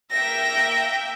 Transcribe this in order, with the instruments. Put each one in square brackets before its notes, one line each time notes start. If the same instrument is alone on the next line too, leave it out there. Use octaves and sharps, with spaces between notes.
[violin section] A#3 E5 G5 [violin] A#6